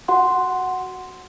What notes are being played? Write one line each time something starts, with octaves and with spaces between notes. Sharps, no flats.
F#4 F#5 C6